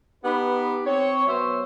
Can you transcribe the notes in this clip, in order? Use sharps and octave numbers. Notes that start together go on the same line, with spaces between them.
B3 D#4 G4 B4
C4 C#5
F#3 B3 C5 C#5 E5